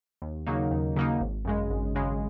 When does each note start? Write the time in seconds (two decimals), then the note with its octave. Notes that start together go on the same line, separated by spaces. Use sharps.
0.22 D#2
0.47 C#3 F#3 A#3 D#4
0.71 D#2
0.96 C#3 F#3 A#3 D#4
1.20 G#1
1.45 F#2 C#3 G#3
1.70 G#1
1.95 F#2 C#3 G#3